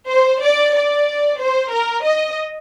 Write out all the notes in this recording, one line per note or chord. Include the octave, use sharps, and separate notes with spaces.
C5
D5
D5
C5
A#4
D#5